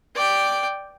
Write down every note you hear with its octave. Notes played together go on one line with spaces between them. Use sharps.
D5 G5